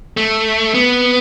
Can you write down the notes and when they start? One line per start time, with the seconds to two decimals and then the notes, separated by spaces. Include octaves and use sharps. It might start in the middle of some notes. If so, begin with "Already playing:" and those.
0.17 A3
0.74 B3